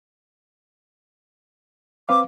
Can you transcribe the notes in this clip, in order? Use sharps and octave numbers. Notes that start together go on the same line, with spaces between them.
C4 B4 F5 D6